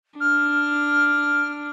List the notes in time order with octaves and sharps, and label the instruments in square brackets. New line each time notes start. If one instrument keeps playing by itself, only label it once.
[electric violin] D4 [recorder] F6